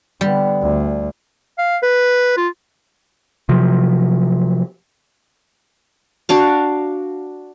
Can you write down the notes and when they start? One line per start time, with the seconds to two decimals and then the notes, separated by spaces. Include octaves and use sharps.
0.21 D3 G3 B3
0.62 D2
1.58 F5
1.82 B4
2.37 F4
3.49 C3 F3 F#3
6.29 D4 F#4 F5